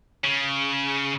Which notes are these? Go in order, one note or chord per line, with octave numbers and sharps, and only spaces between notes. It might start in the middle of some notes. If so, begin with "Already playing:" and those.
C#3